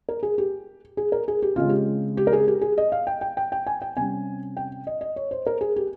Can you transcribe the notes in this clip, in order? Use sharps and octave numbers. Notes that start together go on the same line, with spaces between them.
A#4
G#4
G4
G#4
A#4
G#4
G4
C#3 G#3 C4 F4
G4
G4
A#4
G#4
G4
G#4
D#5
F5
G5
G5
G5
G5
G#5
G5
C3 G3 C#4 G#5
G5
D#5
D#5
C#5
C5
A#4
G#4
G4